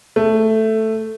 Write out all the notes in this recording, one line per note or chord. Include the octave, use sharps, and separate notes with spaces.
A3